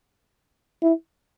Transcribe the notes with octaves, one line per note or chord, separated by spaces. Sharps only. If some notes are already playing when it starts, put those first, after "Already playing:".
E4